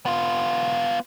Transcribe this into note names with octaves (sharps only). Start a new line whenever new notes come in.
B3 F4